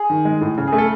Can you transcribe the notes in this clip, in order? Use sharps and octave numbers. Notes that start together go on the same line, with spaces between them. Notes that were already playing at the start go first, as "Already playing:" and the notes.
Already playing: G#4
D#3
G#3
A2
C#3
G#4
A3
A4